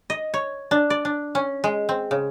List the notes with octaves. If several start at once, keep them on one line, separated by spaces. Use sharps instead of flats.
D#5
C#5
D4
D5
D4
C#4
G#3
C4
C#3